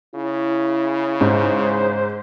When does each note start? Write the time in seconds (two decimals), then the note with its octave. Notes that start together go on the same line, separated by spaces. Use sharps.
0.15 C#3 E4
1.21 G#2 C5